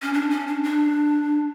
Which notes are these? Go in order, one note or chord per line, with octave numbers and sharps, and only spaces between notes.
C#4
D4
C#4
D4
D4